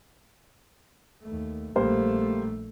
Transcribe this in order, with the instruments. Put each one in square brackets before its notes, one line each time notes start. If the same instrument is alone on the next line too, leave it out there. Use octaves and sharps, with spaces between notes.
[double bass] D#2 A3
[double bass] A#1 A3 [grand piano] G3 A#3 C5